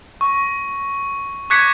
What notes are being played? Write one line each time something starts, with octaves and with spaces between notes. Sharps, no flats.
C#6
C#6 D6 F#6 G#6 B6 C#7